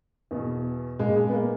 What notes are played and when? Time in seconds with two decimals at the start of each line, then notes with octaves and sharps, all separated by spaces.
0.31 E2 B2
0.99 A#2 G#3
1.16 G#3
1.28 B3
1.33 A#3